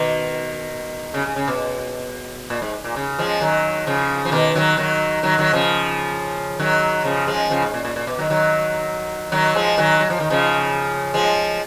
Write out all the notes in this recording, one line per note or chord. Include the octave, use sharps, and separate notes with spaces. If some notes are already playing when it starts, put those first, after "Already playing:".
Already playing: B2 D#3
C#3
C#3
C#3
B2
A#2
G#2
A#2
C#3
F3 G#3
D#3 F#3
C#3 F3
F3
B2 D#3
D#3 F#3
D#3 F#3
D#3 F#3
D#3 F#3
C#3 F3
D#3 F#3
C#3 F3
F3 G#3
C#3 F3
G#2
A#2
A#2
A#2
B2
D#3 F#3
D#3 F#3
D#3 F#3
F3 G#3
D#3 F#3
F#3
F3
D#3
C#3 F3
F3 G#3